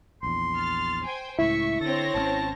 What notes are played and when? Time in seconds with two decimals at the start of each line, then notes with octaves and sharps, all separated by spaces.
0.23 A#1 E2 C6
0.56 F6 A6
1.04 C5 G5 G#5
1.39 C#2 A2 E4 E5 C#6
1.81 D3 C4 A4 C#5 A#6
2.14 G#1 D3 C#4 A5